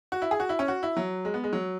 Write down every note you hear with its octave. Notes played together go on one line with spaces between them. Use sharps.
F#4
E4
G#4
F#4
E4
C#4
F#4
E4
F#3
G#3
B3
G#3
F#3